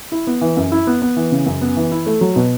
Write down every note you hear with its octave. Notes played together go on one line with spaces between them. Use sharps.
E4
B3
E3
F#2
E4
B3
B3
E3
C#3
F#2
B3
E3
E4
A3
F#3
B2